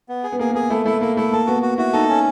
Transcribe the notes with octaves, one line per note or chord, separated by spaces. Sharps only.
B3
G#4
B3
A#3 G#4
B3
A#3 G#4
A3 E4
A3 E4
A#3 E4
A3 E4
A#3 A4
B3 F#4
F#4
E4 F#4
D#4 A4
C#4